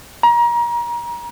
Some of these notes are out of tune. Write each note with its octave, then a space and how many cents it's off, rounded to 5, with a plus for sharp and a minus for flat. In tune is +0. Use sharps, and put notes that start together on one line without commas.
A#5 +30